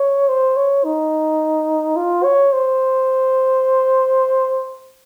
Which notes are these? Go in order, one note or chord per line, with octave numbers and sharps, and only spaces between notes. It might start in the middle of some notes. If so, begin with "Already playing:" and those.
Already playing: C#5
C5
C#5
D#4
F4
C#5
C5